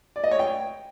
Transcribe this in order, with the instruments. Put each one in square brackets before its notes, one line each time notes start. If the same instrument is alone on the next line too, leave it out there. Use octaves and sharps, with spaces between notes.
[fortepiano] D5
D#5
C#5
G5